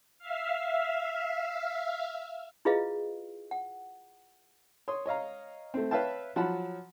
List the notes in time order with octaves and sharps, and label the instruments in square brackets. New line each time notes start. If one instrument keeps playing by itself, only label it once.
[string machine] E5 F5
[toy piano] E4 F4 G#4 B4 D#5 F5
F#5
[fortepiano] C#5 C6 D#6
C#5 D#5 F5 A#5
A3 C4
B4 C#5 E5 F5 G5 A5
F3 F#3 F#5 A5 B5